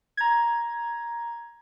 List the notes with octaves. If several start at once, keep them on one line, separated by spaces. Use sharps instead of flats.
A#5 G#6